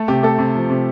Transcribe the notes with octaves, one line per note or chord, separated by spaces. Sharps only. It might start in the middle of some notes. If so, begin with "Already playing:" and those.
Already playing: A3 A4
C3 G4
A3 A4
C3
F3
C3